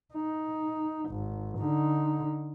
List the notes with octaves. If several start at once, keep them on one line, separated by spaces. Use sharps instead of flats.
D#4
G#1
D3 D#4